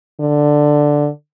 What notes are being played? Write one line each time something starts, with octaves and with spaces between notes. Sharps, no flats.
D3